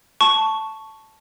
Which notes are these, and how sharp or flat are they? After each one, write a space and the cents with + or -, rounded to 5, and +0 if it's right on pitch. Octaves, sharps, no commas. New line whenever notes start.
A5 +0 C#6 +5